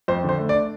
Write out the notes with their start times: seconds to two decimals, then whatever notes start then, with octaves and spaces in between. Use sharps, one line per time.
0.08 F2 C5
0.24 D3 C5
0.39 A3
0.49 D5
0.55 D4